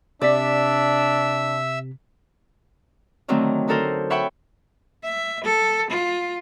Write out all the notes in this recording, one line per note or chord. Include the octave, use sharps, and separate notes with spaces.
C3 D4 D5 E5 E6 B6
D3 D#3 F#3 A3 C4
D3 D#4 F#4 A4 A#4 C5
C#5 E5 F#5 G5 B5 C#6
E5
A4
F4